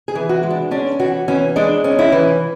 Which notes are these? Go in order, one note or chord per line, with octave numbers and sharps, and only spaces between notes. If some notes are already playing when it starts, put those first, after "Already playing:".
G#4
E3
F#4
G#3
D4
C#4 D4
E3 F#4
E3 C#4
G#3 D4
C#4
E4
E3